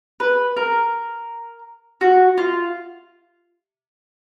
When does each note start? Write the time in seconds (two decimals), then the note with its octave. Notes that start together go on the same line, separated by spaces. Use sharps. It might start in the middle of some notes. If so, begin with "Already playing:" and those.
0.20 B4
0.57 A#4
2.01 F#4
2.38 F4